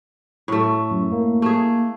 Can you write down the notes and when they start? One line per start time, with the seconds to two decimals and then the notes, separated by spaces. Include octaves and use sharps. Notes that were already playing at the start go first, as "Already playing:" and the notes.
0.48 A2 A3
0.91 F#2
1.12 A#3
1.42 A3 G#4